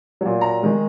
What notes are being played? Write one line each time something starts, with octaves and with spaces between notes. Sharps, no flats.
A#2 F#3
A#5
D#3 G#3